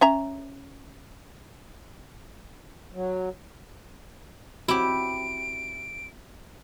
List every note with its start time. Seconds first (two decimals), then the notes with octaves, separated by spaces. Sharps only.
0.01 C#4 E5 A#5
2.93 F#3
4.68 C4 E4 F#4 G4 D7